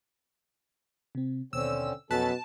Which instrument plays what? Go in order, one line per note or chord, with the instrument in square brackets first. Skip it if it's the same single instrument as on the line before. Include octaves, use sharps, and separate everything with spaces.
[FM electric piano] C3 C4
[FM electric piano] D#2 B2 [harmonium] D3 C4 C#4 [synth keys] E6
[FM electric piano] F2 F#6 B6 [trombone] B2 [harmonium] F#3 C#4 A4 [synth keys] A5